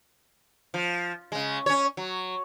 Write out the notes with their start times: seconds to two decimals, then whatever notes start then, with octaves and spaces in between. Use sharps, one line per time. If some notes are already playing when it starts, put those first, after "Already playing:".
0.74 F3
1.32 C#3 G#3
1.66 C#4 C#5
1.97 F#3